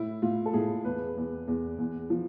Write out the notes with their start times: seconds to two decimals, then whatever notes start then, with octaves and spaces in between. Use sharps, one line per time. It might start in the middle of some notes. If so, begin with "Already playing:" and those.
Already playing: A2 E4
0.22 A2 F4
0.46 A4
0.53 A2 G#4
0.84 E2 B4
1.17 E2
1.47 E2
1.78 E2
2.10 F3